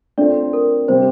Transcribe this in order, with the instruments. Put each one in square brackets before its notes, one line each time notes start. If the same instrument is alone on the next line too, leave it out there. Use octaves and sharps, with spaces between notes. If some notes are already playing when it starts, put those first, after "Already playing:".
[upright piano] A3 C4 F4 A4 [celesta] D4 D5
[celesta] A#4
[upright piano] C3 G3 C4 G4 [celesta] C5